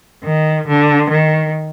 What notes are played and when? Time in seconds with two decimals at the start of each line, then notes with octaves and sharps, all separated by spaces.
0.24 D#3
0.67 D3
1.10 D#3